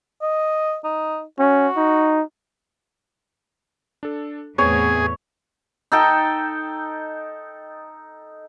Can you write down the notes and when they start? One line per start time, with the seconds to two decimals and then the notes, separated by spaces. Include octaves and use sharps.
0.21 D#5
0.84 D#4
1.39 C#4 F#4
1.77 D#4
4.03 D4 A4
4.58 E2 A2 B3 C4 G#4 C#5
5.92 D#4 A4 G5